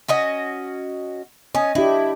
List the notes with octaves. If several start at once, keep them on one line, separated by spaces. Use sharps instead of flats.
C#4 F#4 D#5
C#4 D#5
D4 E4 G4